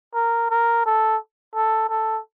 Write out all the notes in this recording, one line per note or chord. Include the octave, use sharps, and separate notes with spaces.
A#4
A#4
A4
A4
A4